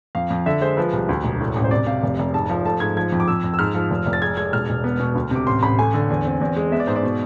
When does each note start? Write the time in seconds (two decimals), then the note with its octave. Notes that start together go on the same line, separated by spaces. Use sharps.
0.15 F2 F5
0.30 F2
0.46 D3 E5
0.61 G#3 C5
0.77 F3 B4
0.93 C2
1.09 D2
1.24 E1
1.40 A2
1.56 A1
1.64 C5
1.71 C3 D5
1.87 C3 F5
2.03 F1
2.19 F1
2.33 G#2 A5
2.50 F3
2.65 A3 A5
2.80 G#2 G#6
2.97 F3 G#6
3.12 F2
3.20 D6
3.28 F2 E6
3.44 F2
3.54 E6
3.59 G#2 F6
3.75 F3
3.90 F1
4.06 F1
4.13 A6
4.22 G#3 G#6
4.37 G#3 G#6
4.53 E1 F6
4.69 E1
4.84 B3
5.00 B2
5.15 D2
5.31 C3 D6
5.47 A1 C6
5.63 A1 B5
5.78 A3 G#5
5.94 D3
6.10 E2
6.25 C4
6.41 E2
6.56 G#3
6.72 B3 E5
6.80 D5
6.87 G#2 C5
6.96 D5
7.03 B2